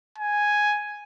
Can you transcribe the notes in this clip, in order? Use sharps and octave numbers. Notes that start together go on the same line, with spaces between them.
G#5